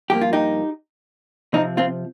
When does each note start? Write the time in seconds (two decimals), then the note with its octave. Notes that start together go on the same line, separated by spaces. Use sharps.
0.10 G2 F3 A#3 G4
0.21 F4
0.33 D#4 G4
1.53 C3 F3 C4 D#4
1.77 C4 F4